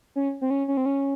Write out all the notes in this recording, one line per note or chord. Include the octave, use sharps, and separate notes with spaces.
C#4
C4
C#4
C#4
C4
C#4